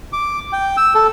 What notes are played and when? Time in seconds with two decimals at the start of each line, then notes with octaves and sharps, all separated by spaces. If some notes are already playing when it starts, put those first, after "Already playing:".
0.13 D6
0.53 G5
0.77 E6
0.95 A4